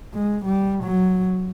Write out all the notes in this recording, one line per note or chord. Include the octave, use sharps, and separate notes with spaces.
G#3
G3
F#3